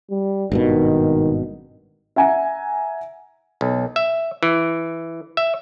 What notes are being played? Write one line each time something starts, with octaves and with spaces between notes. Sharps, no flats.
G3
G#1 G2 B2 D#3
E5 F#5 G#5 A#5
B1
E5
E3
E5